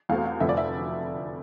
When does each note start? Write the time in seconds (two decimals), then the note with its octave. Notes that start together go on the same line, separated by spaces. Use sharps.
0.09 E2 B2 A3 C4 F5
0.25 F5
0.40 F1 F2 D3 F3 A3 E5
0.49 D5
0.57 E5